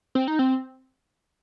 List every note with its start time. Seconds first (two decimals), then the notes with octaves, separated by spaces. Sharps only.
0.15 C4
0.28 D#4
0.39 C4